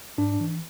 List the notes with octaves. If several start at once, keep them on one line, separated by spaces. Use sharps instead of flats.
G#2 D4
E3